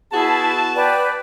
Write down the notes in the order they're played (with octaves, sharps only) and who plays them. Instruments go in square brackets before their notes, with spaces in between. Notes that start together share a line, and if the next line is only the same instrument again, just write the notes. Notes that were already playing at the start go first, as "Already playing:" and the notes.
[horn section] B3 F#4 A5 [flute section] E4 G#4
[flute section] B4 D5 G5